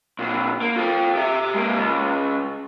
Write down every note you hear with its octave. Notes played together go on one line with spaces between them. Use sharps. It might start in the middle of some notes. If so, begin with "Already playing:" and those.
A#2 D3
A#3
F4 A4
G4 E5
G#3 A#3
C#2